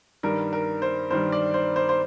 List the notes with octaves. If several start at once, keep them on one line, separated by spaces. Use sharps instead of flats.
G2 D#3 G3 A#4
A#4
C5
G2 D#3 G3 C5
D5
C5
C5
C5